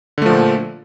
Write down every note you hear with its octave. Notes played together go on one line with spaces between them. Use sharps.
A#2 D3 F3 A3